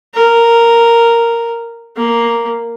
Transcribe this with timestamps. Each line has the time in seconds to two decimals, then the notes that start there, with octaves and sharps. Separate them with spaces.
0.14 A#4
1.96 A#3